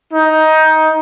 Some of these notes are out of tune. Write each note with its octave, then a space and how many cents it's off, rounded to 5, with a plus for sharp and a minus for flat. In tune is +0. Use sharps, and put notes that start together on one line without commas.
D#4 +15